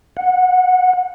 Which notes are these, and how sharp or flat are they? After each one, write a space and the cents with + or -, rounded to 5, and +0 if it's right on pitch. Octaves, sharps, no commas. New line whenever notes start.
F#5 -20